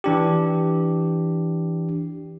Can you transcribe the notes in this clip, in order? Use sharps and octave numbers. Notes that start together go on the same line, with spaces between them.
E3 D4 G4